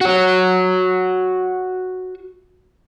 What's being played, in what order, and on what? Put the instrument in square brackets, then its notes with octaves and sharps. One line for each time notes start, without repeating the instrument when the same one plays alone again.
[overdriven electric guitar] F#4 C#5